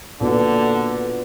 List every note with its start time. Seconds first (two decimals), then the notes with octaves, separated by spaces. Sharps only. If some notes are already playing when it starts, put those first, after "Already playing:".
0.21 A#2 D3 B3 F#4